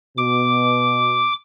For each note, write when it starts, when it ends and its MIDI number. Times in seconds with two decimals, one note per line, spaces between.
0.18 1.25 47
0.18 1.33 86